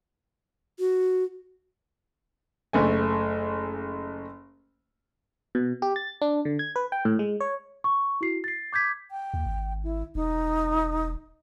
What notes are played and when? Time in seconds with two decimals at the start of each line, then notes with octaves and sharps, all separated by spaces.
0.79 F#4
2.73 F#1 A3 G#5
5.55 B2
5.82 G4
5.96 A6
6.22 D4
6.45 D3
6.59 G#6
6.76 B4
6.92 G5
7.05 A2
7.19 G#3
7.41 C#5
7.84 C#6
8.21 E4 F#4 C7
8.44 A6 C7
8.73 D6 G6 G#6 B6
9.11 G5
9.34 D#2
9.46 G#1
9.84 E4
10.15 E1 D#4